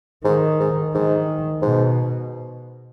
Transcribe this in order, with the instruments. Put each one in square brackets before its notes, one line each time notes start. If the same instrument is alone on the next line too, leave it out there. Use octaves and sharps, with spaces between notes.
[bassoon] G#2 [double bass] D#3
[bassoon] G#2
[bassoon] G#2 [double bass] D#3
[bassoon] G#2 [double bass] B2